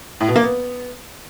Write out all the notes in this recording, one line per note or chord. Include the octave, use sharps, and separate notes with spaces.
A2
B2
A#3
B3